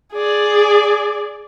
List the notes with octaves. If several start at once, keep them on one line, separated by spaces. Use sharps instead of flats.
G#4 D5